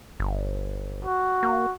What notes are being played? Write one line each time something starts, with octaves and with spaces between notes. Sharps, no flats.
G1
F#4
A#3